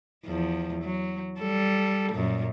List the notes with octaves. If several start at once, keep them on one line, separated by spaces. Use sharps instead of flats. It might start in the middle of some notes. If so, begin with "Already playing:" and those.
E2 F3
F#3
G3 A4
F#2 A#2